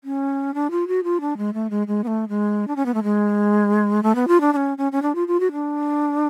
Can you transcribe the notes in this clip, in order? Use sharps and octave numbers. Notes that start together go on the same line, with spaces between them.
C#4
D4
F4
F#4
F4
D4
G#3
A3
G#3
G#3
B3
A3
G#3
D4
C#4
B3
A3
G#3
A3
B3
F4
D4
D4
C#4
C#4
C#4
D4
F4
F4
F#4
D4